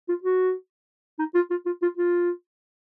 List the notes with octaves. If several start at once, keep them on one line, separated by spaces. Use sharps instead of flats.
F4
F#4
D#4
F4
F4
F4
F4
F4